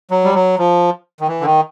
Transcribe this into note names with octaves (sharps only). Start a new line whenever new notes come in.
F#3
G3
F#3
F3
D#3
E3
D3
D#3